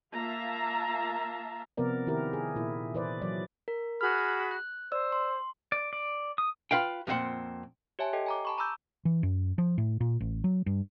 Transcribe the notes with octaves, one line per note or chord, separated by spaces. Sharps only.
A#3 F4 E5 F5 A5 A#5
C3 F3 B3 A#4 D5
D#3 E4 G4 A#4
G#4
A#2 E4
E3 E4 B4 C5 D5
E3 F#3 D5
A#4
F#4 G#4 B5 F6 F#6
F#6
C5 D5 E6
C6
D5
D5
D#6
F4 B4 F5 G5
F2 A#2 F#3 C4 F#5
G4 C#5 E5 G#5 A5
G4 A4 D#5 G5
G#5 A#5 D6
A5 B5 C#6
A#5 B5 D6 E6 G6
E3
F#2
F3
A2
A#2
A1
F#3
G2